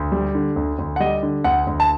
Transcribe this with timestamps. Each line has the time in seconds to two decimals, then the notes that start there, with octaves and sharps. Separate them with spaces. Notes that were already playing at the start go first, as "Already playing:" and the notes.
Already playing: D2
0.12 G3
0.35 D3
0.56 D2
0.79 D2
0.96 F#5
1.00 G3 D#5
1.23 D3
1.44 D2 F#5
1.67 D2
1.80 A5